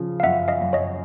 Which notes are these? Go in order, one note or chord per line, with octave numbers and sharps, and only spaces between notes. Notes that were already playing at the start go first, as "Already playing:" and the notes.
Already playing: C#3 F3
F5
F#2 E5 F#5
D#5 F5
F#2
C#5 D#5